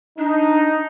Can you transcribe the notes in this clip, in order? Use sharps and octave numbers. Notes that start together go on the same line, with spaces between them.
D4 D#4